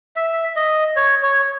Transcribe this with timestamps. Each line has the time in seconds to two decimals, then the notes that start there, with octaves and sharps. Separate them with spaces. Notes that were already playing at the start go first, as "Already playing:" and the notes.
0.16 E5
0.56 D#5
0.96 C#5
1.23 C#5